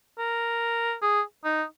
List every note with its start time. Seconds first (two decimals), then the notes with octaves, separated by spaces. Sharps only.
0.19 A#4
1.02 G#4
1.44 D#4